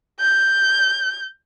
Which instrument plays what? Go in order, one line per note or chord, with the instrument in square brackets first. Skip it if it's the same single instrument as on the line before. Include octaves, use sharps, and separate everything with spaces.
[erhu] G6